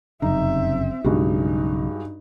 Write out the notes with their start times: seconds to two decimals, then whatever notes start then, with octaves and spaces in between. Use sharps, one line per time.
0.22 F1 F#2 C#3 C4 D#4 E5
1.04 B1 G2 C#3 G#3 D#4 F#4